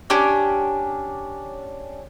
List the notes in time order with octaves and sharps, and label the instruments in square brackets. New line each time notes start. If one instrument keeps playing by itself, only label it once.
[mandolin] C#4 D4 G4